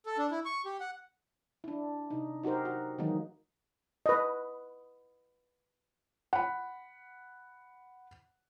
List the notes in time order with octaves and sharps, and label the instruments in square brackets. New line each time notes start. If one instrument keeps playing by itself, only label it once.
[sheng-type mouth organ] A4
D4
E4
C#6
G4
F#5
[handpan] D4 E4
C3 D#4
D#4 F#4 G4 A#4 C5
F#4
D#3 E3 F#3 G#3 A#3 D#4
[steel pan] B4 D#5
[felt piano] F#5 B5